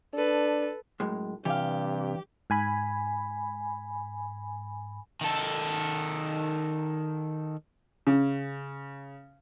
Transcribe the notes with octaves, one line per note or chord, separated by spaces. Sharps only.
D4 A4 B4
F#2 A2 G#3
G2 C3 E3 G4 F5
G#2 G#5 B5
D#3 A4
C#3